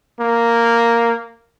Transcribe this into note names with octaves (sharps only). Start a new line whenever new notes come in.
A#3